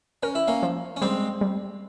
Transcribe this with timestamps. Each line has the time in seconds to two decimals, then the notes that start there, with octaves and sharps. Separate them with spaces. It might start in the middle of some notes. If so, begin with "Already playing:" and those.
0.23 C#4 A#4
0.35 E4
0.48 A#3 C#4
0.63 F3
0.96 C#4
1.01 G3 G#3 C4
1.41 G3